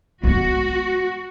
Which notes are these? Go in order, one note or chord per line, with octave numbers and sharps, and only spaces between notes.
G#3 B3 F#4